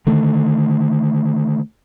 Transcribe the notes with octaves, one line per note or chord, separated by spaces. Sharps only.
D3 D#3 A3